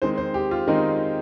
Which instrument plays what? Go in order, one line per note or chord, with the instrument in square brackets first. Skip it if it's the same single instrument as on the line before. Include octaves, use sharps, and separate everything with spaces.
[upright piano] D#3 G#3 C4 C5
C5
G4
F4
D#3 G#3 C4 D#4